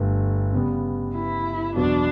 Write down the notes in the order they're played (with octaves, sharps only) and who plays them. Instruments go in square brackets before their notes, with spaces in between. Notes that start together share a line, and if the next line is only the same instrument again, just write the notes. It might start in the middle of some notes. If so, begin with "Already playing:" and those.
Already playing: [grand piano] G1 G2 D3 A3
C#3 G3 B3
[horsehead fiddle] E4
[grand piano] E2 B2 F#3 B3 F#4 [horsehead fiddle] D4